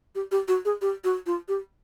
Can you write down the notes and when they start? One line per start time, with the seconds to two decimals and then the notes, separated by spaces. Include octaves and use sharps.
0.15 G4
0.32 G4
0.48 F#4
0.65 G#4
0.82 G4
1.04 F#4
1.26 F4
1.48 G4